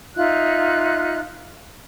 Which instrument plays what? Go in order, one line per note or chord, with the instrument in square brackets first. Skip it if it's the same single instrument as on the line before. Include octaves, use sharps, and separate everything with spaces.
[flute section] D#4 F4 E5 F#6